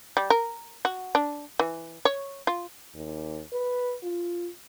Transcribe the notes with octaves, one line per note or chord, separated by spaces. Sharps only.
G3
A#4
F#4
D4
E3
C#5
F4
D#2
B4
F4